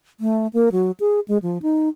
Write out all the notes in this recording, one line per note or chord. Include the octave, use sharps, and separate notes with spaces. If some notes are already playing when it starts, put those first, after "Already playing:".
A3
A#3
F#3
G#4
G#3
F3
D#4